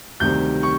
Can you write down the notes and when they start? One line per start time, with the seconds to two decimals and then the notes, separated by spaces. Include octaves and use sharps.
0.20 D2 C3 D#3 G3 G6
0.63 C#6